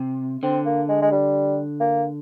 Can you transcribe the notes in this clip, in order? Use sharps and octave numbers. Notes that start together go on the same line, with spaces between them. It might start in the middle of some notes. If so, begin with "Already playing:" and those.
Already playing: C3
D3 C4
A#3
G#3
G#3
G3
A#3